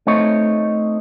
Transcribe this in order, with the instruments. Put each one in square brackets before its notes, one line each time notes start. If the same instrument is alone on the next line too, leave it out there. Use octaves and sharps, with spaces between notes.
[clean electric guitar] A3 C4 D#4 C#5